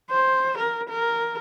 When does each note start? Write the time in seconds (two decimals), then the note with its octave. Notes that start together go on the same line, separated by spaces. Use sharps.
0.11 C5
0.57 A#4
0.89 A#4